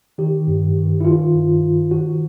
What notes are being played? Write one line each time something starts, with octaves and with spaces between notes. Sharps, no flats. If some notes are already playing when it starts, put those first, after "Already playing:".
D#3 G4
G2
D#3
E4
D#3 F4
G2
D#3
D#3 F#4